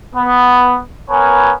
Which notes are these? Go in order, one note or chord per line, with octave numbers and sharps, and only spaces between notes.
B3
B3 A#4 B4 C#5 G#5